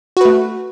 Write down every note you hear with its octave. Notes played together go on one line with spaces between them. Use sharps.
A3 F#4 B4